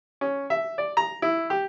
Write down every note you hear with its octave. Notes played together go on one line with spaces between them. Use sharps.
C#4
E5
D5
A#5
E4
G4